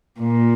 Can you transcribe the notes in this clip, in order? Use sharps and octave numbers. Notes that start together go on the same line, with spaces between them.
A#2